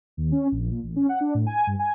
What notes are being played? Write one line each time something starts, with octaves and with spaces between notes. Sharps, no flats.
D#2
C#4
A#1
A#2
A1
C#4
F#5
D4
A2
G#5
G2
G#5